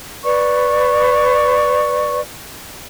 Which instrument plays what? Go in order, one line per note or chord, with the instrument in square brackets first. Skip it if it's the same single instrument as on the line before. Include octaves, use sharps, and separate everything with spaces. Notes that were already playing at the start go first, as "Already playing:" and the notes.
[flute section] B4 D5 C#6